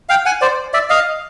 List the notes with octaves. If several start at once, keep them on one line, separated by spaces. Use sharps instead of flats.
F5 G5
F#5 G#5
C5 D5
D5 E5
D#5 F5